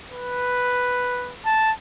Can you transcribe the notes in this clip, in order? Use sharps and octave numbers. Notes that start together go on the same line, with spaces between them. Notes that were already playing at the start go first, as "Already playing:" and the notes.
B4
A5